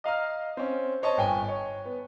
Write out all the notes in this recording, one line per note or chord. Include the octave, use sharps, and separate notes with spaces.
D#5 F5 A#5 F6
C4 C#4
C5 C#5 D#5 A5
G1 G5 G#5
C#5
B3